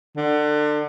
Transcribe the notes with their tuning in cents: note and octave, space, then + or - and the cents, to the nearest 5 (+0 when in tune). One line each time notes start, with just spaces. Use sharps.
D3 +30